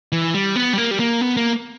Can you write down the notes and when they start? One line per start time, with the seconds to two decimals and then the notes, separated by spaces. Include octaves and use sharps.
0.12 E3
0.34 G3
0.56 B3
0.73 G3
0.78 A#3
0.91 G3
1.00 A#3
1.21 B3
1.37 A#3